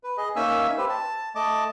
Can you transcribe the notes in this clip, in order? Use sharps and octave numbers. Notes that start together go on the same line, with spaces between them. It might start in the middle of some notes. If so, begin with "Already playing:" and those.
B4
G#4 D#5
A#3 C#4 D#4 E5 G#5 E6
G4 B4 C5
A5
A3 D#5 A5 D6